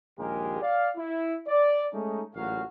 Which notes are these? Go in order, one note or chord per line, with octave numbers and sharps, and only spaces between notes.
A#1 D#2 G#3 G4 G#4 A#4
D5 F5
E4
D5
G#3 A3 C#4 D#4
A1 A#2 C#3 F#3 F#4 F5